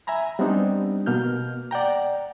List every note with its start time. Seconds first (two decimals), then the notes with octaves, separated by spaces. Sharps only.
0.07 E5 G#5 A#5 B5
0.39 G3 B3 C4 D4 D#4
1.06 B2 A#3 F6 G6
1.71 D5 F#5 G5 A#5